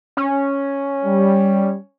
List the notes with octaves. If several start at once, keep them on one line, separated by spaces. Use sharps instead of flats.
C#4
G3